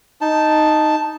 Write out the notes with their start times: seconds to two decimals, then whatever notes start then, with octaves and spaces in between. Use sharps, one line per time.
0.21 D#4 A5